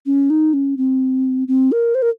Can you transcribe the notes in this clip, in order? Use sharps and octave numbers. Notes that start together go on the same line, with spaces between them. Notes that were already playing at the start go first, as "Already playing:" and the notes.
C#4
D#4
C#4
C4
C4
A#4
C5
A#4